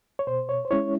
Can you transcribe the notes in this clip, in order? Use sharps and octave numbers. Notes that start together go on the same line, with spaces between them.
C#5
B2 C5
C#5
C5
G#3 C#4 E4 C#5